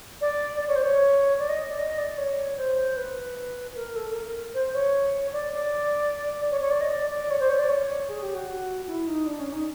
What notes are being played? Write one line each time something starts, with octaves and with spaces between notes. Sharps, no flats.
D5
D5
C#5
C5
C#5
D5
D#5
D5
D#5
D5
C#5
C5
B4
A#4
A4
A4
A#4
C5
C#5
D5
D5
C#5
C#5
D5
D#5
D5
D5
C#5
C5
C#5
D5
C#5
G#4
G4
F#4
E4
D#4
D4
C#4
D#4